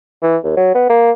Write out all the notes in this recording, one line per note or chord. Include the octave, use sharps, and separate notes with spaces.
E3
D#2
F#3
B3
A#3